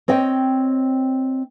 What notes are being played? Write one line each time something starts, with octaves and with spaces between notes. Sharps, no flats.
C4 C#5 D#5 G5